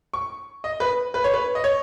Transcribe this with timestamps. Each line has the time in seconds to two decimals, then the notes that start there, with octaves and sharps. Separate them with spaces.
0.14 C#6
0.64 D#5
0.80 B4
1.14 B4
1.24 C#5
1.34 B4
1.55 D#5
1.64 C#5